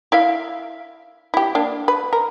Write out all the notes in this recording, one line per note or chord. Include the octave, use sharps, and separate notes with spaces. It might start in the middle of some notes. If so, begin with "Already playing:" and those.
E4 E5 F5
E4 G4
A#3 D4
B4
A#4